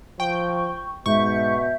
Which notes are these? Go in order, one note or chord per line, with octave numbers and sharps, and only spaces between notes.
F3 G5 C#6
G#2 B2 E5 C#6 G6